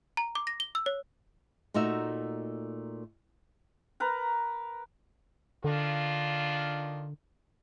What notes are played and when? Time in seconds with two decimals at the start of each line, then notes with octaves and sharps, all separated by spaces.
0.17 A#5
0.35 D6
0.47 A#6
0.60 G7
0.75 E6
0.86 C#5
1.74 A#2 A3 D#4 F#4 E5
4.00 A#4 B4 A#5
5.64 D3 D#3 D4 F4